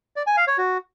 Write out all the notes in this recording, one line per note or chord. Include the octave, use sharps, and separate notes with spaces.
D5
G#5
F5
C#5
F#4